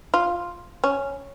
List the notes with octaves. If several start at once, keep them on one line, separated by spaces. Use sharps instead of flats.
F4
C#4